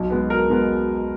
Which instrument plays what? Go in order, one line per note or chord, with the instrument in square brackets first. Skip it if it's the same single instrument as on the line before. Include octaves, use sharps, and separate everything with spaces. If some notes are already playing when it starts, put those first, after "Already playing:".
Already playing: [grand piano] B1
B2 G#3 B3
B1 A#4
B2 G#3 B3